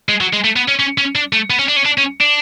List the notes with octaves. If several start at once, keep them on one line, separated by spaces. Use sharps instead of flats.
G#3
F#3
G#3
A3
B3
C#4
C#4
C#4
D4
A3
B3
C#4
D4
C#4
D4
C#4
D4